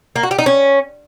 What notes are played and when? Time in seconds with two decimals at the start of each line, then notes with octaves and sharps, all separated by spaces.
0.16 A#3
0.23 F#4
0.31 G4
0.38 D#4
0.46 C#4